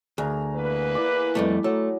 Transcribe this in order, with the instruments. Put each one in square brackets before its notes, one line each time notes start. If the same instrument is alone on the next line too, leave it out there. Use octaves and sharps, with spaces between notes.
[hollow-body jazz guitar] D2 [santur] G#4 A#4
[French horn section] E2 A#3 B4
[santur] E4 D5 D6
[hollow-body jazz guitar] F2 G3 A3
[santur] F#3 [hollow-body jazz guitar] A3